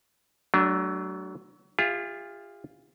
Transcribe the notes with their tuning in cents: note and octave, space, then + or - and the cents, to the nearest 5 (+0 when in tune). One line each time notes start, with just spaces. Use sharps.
F#3 +30 A3 -15 D4 +0
F4 +0 G#4 -45 E5 +0